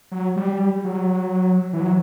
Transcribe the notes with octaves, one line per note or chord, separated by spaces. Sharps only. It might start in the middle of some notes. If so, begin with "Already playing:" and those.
F#3
G3
F#3
E3
F#3